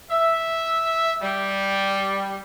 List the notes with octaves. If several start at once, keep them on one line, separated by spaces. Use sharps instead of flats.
E5
G3